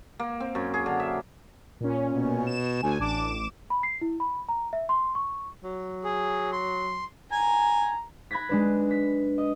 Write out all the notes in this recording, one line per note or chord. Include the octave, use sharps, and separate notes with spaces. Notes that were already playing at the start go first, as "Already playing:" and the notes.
A#3
C4
F#2
G#4
D3
E5
A#2 C#4
B2
E7
D2 G#5
A1 D4 D6 E7
B5
C7
E4
B5
A#5
E5
C6
C#6
F#3
G#4
C6
G#5 A#5
B5 F#6 G#6 A#6 B6
G#3 D4 B4
B6
D#5